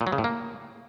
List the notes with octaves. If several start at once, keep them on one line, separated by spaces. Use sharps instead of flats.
A#2
F#3
C#3
A2
A#3